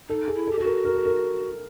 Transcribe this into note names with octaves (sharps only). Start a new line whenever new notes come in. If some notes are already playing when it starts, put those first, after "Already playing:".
D#4 A4
G#4
E4
A4
G4
F#4 A4
A#4
A#4
A4
A#4